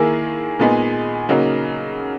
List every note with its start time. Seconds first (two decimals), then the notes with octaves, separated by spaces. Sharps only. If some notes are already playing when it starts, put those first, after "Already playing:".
Already playing: D#3 A#3 E4 G#4
0.59 A#2 G#3 B3 D#4 G#4
1.29 C#3 F#3 A#3 D#4